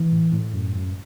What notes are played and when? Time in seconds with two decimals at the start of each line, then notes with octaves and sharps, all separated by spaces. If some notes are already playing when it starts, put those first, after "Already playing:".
Already playing: E3
0.12 A2
0.32 A2
0.54 F#2
0.75 F#2